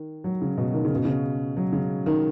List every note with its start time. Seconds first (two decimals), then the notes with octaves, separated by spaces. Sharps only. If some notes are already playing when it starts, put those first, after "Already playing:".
Already playing: D#3
0.24 F#3
0.42 C#3
0.57 B2
0.74 D#3
0.85 C#3
0.95 B2
1.05 C#3
1.57 F#3
1.73 C#3
2.06 D#3